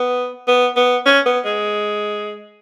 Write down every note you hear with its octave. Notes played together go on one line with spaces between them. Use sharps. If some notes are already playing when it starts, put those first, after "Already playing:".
Already playing: B3
B3
B3
C#4
B3
G#3